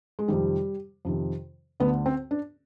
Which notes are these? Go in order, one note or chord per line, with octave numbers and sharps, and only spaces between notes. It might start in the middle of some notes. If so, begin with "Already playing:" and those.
G#3
F2 C3 D#3 G3
F2 C3 D#3
D2 D3 B3
C4
D4